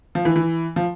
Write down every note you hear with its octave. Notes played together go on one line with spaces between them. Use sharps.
F3
E3
E3
F3